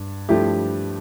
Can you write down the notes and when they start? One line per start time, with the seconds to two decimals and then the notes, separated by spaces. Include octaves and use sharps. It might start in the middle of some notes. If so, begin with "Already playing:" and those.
Already playing: G2
0.29 G2 F3 A3 E4 G4